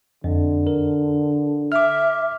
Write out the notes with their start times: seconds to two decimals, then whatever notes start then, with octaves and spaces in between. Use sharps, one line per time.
0.24 F2 D3
0.67 A#4
1.72 E5 D6 F6